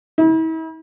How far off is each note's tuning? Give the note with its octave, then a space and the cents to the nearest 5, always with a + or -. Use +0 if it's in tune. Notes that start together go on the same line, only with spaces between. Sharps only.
E4 -40